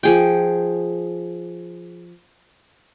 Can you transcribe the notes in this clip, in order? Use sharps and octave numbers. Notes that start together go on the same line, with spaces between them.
F3 G#4 G5